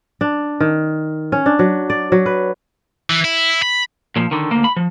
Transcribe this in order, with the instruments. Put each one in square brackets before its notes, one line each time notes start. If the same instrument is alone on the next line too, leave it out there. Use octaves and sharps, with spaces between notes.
[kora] D4
D#3
C#4
D4
F#3
D5
F#3
B4
[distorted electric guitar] E3
E4
B5
[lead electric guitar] A#2 F3
D3 D#3
D2 A#3
B5
F3